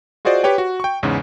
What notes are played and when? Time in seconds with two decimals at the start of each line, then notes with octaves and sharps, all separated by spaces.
0.25 F4 F#4 G#4 C5 D5 D#5
0.44 G4 B4 C#5 G5
0.58 F#4
0.80 G5 C#6
1.03 E2 G#2 C#3